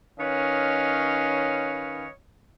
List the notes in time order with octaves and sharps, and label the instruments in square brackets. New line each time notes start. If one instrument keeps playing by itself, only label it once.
[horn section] D#3 C#4 B4 C#5 D#5 F5